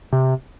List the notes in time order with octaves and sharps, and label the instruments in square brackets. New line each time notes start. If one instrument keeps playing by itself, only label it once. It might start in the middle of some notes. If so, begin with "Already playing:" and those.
[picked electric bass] C3